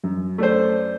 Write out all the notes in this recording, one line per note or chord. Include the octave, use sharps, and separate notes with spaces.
F#2
A3 D4 C5